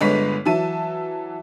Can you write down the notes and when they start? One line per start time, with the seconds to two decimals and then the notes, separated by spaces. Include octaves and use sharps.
0.01 G1 D3 G#3 B4 C#5 B6
0.45 E3 F#3 E5 A5 D#7